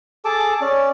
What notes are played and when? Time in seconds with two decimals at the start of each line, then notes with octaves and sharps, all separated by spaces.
0.25 G#4 A4 A5 D6
0.61 C#4 D5